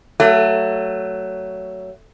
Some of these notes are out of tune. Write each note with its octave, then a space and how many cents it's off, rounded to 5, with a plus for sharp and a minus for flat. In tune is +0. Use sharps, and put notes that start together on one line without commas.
F#3 +20 A3 +25